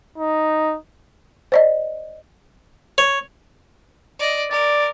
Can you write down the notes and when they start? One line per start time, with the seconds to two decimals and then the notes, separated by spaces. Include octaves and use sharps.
0.18 D#4
1.52 C5 D5 D#5
2.98 C#5
4.19 D5 D#5
4.51 A#4 D5